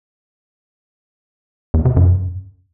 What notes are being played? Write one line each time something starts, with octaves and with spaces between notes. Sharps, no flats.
E2
C3
F#2